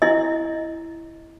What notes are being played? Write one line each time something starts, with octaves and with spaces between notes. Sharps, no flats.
E4 D#5